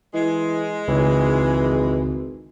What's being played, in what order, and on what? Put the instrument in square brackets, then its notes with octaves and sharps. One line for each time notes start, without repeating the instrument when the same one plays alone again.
[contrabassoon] E3 [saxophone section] G#3
[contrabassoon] G#1 [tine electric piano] C#2 [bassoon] E3